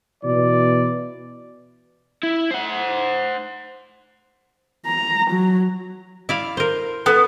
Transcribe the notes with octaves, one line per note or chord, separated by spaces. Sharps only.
B2 E3 D5
E4
C5 F#5
A#5
F#3
E4 D5 F5
A#4 C5
B3 A4